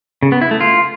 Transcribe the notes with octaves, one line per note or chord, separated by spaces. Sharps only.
C#3
B3
E4
A3
F4